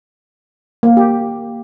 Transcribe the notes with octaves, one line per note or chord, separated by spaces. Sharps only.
A#3
G4